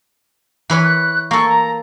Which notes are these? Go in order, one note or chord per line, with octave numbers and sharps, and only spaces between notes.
E3 B4 C#5
F#6
A#3 A4 C#6
A#5